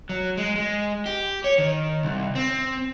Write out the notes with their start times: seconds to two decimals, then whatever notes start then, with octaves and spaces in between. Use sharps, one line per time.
0.09 F#3
0.37 G#3
0.56 G#3
1.06 G4
1.44 C#5
1.58 D#3
2.03 C2
2.35 C4